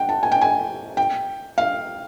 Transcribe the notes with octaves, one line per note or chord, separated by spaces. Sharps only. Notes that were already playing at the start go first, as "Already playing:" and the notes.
Already playing: F#5 G5
A5
G#5
G5
G#5
G5
F5